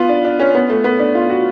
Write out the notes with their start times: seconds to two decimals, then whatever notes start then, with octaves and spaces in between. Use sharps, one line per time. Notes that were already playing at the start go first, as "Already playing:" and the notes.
Already playing: B3 F4
0.09 D4
0.25 D4
0.40 C#4
0.55 B3
0.70 A3
0.84 B3
0.99 D4
1.15 F4
1.30 F#4